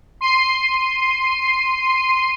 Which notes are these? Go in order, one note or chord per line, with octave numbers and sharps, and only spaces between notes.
C6 C7 D#7